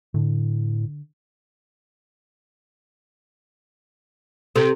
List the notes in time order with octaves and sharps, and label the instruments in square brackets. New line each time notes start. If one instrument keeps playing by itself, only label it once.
[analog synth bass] A2 [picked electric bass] D3
[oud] C3 [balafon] A4